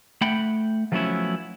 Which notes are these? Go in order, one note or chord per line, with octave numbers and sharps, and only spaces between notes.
A3 F#5 G5 B5
F3 F#3 A3 B3 C#4 E4